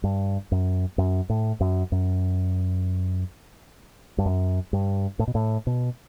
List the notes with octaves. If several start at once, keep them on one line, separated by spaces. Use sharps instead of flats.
G2
F#2
F#2
A2
F#2
F#2
G2
F#2
G2
A2
B2
A2
B2